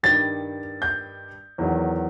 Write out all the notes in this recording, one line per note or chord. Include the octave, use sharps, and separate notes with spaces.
G2 D#3 G3 A6
G6
E2 D#3 F#3